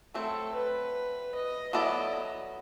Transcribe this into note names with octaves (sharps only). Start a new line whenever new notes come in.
F#3 A3 C4 E4 A4
B4
D#5
F#3 B3 E4 A4 D5 D#5